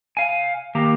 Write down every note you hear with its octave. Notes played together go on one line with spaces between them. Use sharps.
F5 G#5
D#3 A#3 G4 A#5